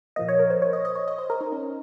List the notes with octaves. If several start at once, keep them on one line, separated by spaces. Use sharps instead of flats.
A#2 F3 A#3 D#5
C#5
A#4
C5
C#5
D#5
D#5
C#5
D#5
C5
A#4
D#4
C#4